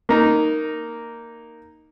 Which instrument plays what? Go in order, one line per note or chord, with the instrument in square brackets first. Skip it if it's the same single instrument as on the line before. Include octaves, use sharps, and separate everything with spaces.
[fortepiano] A#3 D#4